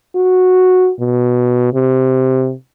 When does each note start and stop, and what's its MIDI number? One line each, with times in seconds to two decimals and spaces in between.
0.15 0.90 66
0.99 1.73 47
1.74 2.53 48